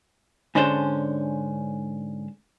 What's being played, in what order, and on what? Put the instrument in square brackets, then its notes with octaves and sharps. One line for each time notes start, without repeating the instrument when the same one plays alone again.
[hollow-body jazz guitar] G#2 D3 C#4 D4 C5 A5